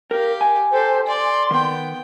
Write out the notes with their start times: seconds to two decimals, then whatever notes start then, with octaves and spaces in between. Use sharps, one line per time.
0.11 G4 A#4 F5
0.41 G#5
0.72 G4 A4 C5
1.07 D5 C6
1.51 D#3 B3 G5